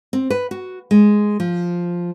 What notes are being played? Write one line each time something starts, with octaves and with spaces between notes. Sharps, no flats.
C4
B4
F#4
G#3
F3